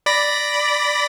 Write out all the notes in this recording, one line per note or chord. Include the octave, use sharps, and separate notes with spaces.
D5 B5 A#6